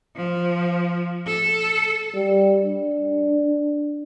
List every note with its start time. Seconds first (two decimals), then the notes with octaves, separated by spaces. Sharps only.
0.16 F3
1.26 A4
2.14 G3
2.64 D4